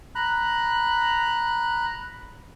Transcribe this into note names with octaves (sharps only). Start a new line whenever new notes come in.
A#5 B5 F#6